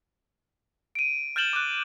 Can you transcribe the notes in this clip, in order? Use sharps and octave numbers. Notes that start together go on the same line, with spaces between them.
D7 D#7
F6 G6 A6 E7 F#7 G7
D6 F#6